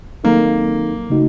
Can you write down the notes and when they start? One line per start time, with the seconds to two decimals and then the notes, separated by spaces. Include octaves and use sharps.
0.24 D#3 F#3 A#3 C4 D#4 A4
1.10 C#3 A3 D#4 F#4